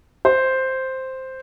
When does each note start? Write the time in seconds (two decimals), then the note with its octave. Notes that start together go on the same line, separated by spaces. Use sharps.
0.25 C5